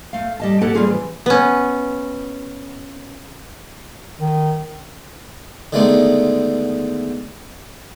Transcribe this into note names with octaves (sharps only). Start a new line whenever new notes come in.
A3 F5
G3 D#5 A5
A#3 G4 A4 F#5 A5
G3 A#3 C#4 F4 G#4
E3 F3
B3 C#4
D#3
D3 D#3 G#3 A3 B3 D4